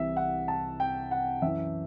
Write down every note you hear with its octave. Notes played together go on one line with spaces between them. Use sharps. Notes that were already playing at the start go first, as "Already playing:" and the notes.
Already playing: C2 C3 E3 E5
F#5
A5
G5
F#5
F#2 E3 E5